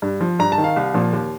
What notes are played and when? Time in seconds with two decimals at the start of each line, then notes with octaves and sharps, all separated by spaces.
0.02 G2
0.21 F3
0.39 G2 A#5
0.52 A5
0.58 D#3
0.64 F5
0.76 C2
0.94 A#2 F3
1.13 D#2